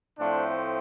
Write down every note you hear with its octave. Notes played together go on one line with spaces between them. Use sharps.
A2 F3 A3 C4 D4